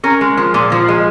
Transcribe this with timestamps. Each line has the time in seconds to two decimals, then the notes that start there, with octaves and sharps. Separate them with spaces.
0.04 C#4 A#4
0.21 G#3
0.37 F3
0.54 A#2
0.72 F3
0.88 G#3